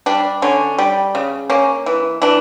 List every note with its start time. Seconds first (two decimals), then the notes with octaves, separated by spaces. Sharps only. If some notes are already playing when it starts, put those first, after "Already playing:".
0.06 G3 D4
0.42 D3 C#4
0.78 G3
1.15 C#3
1.50 A#3 C#4
1.86 E3
2.22 E3 D4